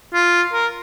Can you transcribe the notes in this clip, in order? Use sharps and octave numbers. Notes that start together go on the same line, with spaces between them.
F4
A#4